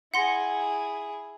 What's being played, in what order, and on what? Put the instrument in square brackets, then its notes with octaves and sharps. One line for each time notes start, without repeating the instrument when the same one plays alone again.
[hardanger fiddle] E4 G#4 [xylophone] F#5 C6 A#6